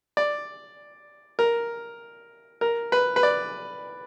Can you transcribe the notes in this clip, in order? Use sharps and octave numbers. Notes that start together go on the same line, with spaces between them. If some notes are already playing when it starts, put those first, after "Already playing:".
D5
A#4
A#4
B4
B4
D5